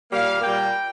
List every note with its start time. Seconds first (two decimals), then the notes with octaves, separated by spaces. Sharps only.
0.12 A#2 G3 A#3 F5
0.41 A#2 G3 A#3 G5